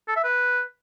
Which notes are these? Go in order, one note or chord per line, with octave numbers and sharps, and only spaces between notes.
A4
E5
B4